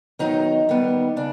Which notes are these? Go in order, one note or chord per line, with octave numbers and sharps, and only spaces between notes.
D#3 F#3 B3 D#4
D#3 G3 B3
C#3 D4